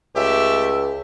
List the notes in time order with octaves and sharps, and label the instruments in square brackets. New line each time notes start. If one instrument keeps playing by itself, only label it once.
[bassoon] C#2 [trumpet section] A3 G4 E5